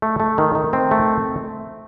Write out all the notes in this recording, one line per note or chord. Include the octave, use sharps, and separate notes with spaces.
A3
A3
D#3
D#3
C4
A3